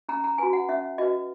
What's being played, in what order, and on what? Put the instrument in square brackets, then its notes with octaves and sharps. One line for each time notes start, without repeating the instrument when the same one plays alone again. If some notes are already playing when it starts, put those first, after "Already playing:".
[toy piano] C#4 A#5
A#5
F#4 B4 G#5
F#5
C#4 E5
F#4 B4 D#5